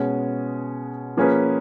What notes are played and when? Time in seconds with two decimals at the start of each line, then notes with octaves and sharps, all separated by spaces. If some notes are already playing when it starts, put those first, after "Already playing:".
Already playing: B2 G#3 C#4
1.17 F3 A#3 C#4 G#4 B4